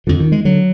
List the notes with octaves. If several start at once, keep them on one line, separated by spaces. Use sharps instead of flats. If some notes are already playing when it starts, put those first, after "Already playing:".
F2 D3 F3
D#3
G#3
D3 F#3